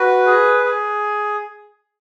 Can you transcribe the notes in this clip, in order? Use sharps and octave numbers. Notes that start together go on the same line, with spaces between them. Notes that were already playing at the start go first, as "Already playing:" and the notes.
Already playing: F#4 B4
G#4
G#4